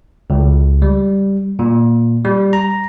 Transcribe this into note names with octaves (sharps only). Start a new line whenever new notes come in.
C#2
G3
A#2
G3
A#5